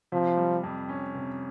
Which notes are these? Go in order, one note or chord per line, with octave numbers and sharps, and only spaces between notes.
C3 F3
G3
F2
C#4
C3